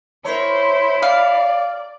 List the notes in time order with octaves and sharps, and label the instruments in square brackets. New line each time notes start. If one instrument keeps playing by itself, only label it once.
[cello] E4 [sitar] A#4 C#5 [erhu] C5
[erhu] D5 [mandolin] F5